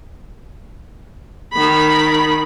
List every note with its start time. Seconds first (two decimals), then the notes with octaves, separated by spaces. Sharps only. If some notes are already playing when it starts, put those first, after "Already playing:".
1.53 D#3 B5